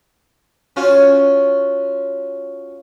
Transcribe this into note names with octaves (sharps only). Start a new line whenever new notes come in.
C#4 F4 F#4